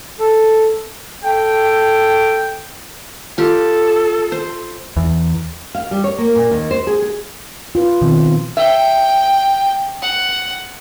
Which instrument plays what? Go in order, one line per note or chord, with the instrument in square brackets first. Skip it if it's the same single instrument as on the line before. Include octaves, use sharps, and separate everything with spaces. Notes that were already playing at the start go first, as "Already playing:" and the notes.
[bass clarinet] A4
[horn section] A4 G5
[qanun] F4 G4 [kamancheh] A4
[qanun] C5
[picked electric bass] E2
[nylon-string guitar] F5
G3
C#5
A#3
A#2
D#2
C5
G#4
G#4
[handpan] F4 B4
B2 D#3 F3 C4
[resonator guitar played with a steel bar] E5 [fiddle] G5
[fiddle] F#5